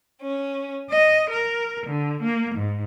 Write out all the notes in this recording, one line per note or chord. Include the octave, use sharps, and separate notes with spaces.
C#4
D#5
A#4
D3
A#3
G#2